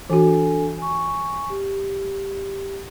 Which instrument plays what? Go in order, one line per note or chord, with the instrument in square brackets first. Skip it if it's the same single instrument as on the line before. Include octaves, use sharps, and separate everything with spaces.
[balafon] E3 F#4 [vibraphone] D4 A4 G#5
[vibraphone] G#5 C#6
G4